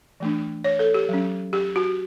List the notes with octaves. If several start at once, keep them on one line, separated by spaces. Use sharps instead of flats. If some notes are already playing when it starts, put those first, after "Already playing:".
E3 A3 D4
C#5
A4
G4
F#3 C#4
G4
F#4